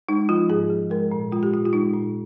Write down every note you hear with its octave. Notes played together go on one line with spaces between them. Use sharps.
G#3 D#4
F3 F4
G#2 G#4
F3
G#3 A#4
A#2
G#3 F4
G4
A#2 F4
F4
G#3 D#4
A#2